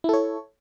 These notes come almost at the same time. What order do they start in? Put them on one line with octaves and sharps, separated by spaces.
E4 A4 C#5